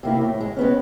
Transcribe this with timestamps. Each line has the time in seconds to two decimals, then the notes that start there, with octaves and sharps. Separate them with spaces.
0.03 C3 A#3 E4
0.21 A2
0.41 G#3
0.56 G#3 B3 C#4